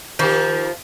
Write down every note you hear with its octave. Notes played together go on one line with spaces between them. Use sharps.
D#3 F3 G4